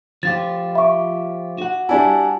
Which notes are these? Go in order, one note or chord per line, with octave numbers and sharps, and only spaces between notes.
F3 F4 G4 A6
E5 B5 C#6 D6
F#4 F#5
G3 D4 E4 G#5 A5